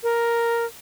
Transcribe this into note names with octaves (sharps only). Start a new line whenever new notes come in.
A#4